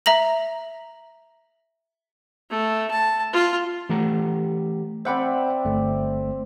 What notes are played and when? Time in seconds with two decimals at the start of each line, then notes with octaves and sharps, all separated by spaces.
0.06 E5 A#5 A#6 F#7
2.50 A3
2.90 A5
3.33 F4
3.89 E3 A3 G4 F#5 A#5
5.05 C4 C5 D5 E5 F#5 B5
5.65 G1 A3